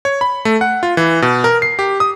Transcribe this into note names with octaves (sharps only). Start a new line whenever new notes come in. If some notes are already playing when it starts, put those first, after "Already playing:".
C#5
B5
A3
F#5
F4
E3
B2
A#4
C7
G4
D#6